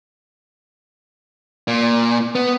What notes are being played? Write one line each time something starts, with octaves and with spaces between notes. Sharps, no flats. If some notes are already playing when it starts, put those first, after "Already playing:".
A#2
B3